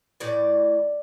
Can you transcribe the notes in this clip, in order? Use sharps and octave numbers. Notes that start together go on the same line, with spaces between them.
A2 E3 D5